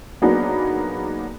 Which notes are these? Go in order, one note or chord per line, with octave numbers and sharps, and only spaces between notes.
F#3 A#3 B3 D4 D#4 G#4